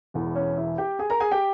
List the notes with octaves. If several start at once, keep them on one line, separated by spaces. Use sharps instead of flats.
E1 E2 E3
C#4 C#5
E4 E5
G4 G5
G#4 G#5
A#4 A#5
G#4 G#5
G4 G5